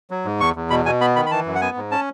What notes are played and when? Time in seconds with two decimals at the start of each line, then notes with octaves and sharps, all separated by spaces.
0.11 F#3
0.25 G#2
0.40 E2 C#6
0.56 E2
0.70 B2 B5
0.85 B2 G#5
1.01 B3 B5
1.16 D#3 B5
1.26 B5
1.31 E3 A5
1.46 F#2
1.55 F#5
1.61 B3 G#5
1.76 G#2
1.91 C#4 A5